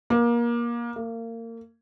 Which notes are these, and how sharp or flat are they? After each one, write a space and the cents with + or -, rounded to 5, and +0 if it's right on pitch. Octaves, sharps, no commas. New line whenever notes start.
A#3 +25
A#3 -30